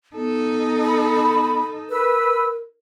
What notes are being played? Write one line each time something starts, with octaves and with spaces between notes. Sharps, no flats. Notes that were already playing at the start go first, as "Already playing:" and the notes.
B3 D#4 A4
B5
A#4 B4 E6